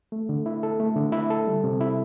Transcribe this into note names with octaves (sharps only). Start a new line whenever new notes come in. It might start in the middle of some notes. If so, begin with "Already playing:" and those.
A3
D3
E4
A4
A3
D3
E4
A4
G3
C3
E4